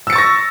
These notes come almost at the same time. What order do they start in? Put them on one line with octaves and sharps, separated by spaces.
E6 C#7 A6 C#6 A#6